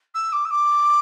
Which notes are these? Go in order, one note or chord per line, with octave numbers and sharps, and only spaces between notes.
E6
D6
E6
D6